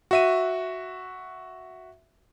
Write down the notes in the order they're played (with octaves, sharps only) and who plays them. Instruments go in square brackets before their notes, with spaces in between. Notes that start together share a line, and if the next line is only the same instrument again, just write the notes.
[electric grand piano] F#4 E5 D#7